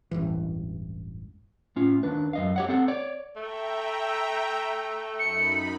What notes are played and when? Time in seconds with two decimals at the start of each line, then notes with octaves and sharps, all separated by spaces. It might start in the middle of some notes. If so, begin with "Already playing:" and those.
0.11 E1 A1 G2 E3
1.76 A2 C#4 F4
2.03 D#2 D4 B4
2.33 F#2 D#5 F5
2.56 G4 C#5 F#5
2.69 C4 A4 F#5
2.88 C#5 D5
3.36 A3 E5 G5 A#5
5.19 F#2 D#4 B5 C#7